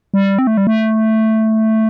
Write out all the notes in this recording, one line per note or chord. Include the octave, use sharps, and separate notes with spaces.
G3
C4
A3
G3
A3